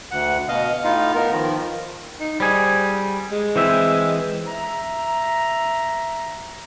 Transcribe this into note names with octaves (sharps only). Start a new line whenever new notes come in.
D2 F#5
B2 D#5 F5
A2 D#4 F4 F5
B3 A#4
D#3 F3
D#4
G3 G#4 C5
G#3
E3 C4 E5
E5 A#5